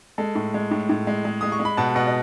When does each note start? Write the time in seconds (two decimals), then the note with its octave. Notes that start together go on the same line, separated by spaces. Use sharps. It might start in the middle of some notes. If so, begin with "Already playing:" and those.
0.18 G#3 A4
0.35 A2
0.54 G#3
0.71 A2
0.89 A2
1.07 G#3
1.25 G#3
1.41 G#3 D#6
1.52 C#6
1.60 G#3
1.65 B5
1.77 B2 F#5 A5
1.95 B2 D#5 F#5
2.07 D#5